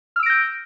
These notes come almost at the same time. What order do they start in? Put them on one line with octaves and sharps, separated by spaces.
F6 E6 D7 A#6 G6